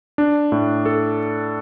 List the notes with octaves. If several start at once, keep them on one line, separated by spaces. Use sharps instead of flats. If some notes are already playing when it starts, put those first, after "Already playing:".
D4
A2
A4